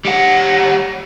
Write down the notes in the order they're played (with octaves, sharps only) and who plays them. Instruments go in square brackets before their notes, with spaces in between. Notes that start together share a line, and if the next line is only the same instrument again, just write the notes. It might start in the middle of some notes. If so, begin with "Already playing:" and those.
[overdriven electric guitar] G3 F#5